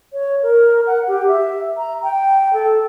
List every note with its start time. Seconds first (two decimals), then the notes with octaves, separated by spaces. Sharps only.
0.13 C#5
0.43 A#4
0.87 F#5
1.08 G4
1.28 E5
1.78 A#5
2.03 G5
2.53 A4